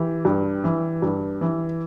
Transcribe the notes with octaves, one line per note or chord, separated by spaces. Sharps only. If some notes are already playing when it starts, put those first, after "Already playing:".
Already playing: E3 G4
G2
E3
G2
E3